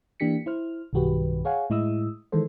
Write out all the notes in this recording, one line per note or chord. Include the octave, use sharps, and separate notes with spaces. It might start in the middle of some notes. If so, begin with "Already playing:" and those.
E3 A#3 D4 G4 B6 C#7
E4 C5 F6
B1 G2 D#3 F#4 G4 B4
G#4 C#5 F5 F#5 G#5
A2 G#3 E4 D#5 D#6 E6
D#3 E3 G#3 A4 C5